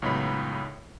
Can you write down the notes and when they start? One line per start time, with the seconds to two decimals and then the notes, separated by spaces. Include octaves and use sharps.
0.02 C#2 F#2 A2 B3 D#4 B5